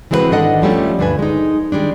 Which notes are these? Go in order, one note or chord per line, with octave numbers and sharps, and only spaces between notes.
E3 G#3 C4 E4 F#4 B4
G#2 D#3 D4 A4 D#5 F#5
F3 G3 A3 C#4
D2 G2 D4 B4 G#5
G#3 D#4
D#3 G3 G#3 D4